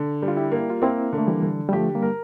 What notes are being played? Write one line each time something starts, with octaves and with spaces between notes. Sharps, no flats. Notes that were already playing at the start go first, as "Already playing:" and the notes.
Already playing: D3
G3
F4
E4 G4
A#3
F4
A#3 C4 E4
D3
A3
E3 G3
D3
G3
F3 A3 G4
G3 A#3
A#4